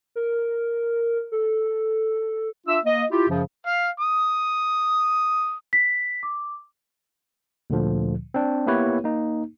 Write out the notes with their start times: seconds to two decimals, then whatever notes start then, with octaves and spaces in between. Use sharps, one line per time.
0.15 A#4
1.32 A4
2.67 D4 F4 E5 E6
2.84 A#3 D#5
3.11 E4 F4 G4
3.29 F#2 C#3 F3
3.67 F5
4.00 D#6
5.73 B6
6.23 D6
7.70 D2 A#2 D3 F3
8.34 C4 D4
8.67 A#3 B3 E4 G4 B4 C#5
9.04 A#3 D#4